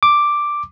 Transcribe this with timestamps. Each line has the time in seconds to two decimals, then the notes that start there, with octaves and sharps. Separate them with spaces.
0.03 D6